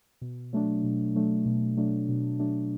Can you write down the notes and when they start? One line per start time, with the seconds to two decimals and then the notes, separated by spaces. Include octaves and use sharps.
0.22 B2
0.53 F#3 A3 D4
0.83 B2
1.15 F#3 A3 D4
1.46 B2
1.77 F#3 A3 D4
2.09 B2
2.39 F#3 A3 D4